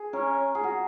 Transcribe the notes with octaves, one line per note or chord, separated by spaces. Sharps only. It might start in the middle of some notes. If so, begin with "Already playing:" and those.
Already playing: G#4
C#4 A#4
G#4
F#4